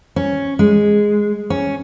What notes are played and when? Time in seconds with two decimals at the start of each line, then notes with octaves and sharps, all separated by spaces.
0.16 C#4
0.59 G#3
1.50 C#4